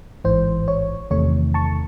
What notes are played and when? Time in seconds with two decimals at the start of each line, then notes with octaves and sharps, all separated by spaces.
0.25 A1 G#2 E3 C5
0.68 C#5
1.11 E2 C3 D#3 A3 C#5
1.54 A5 C#6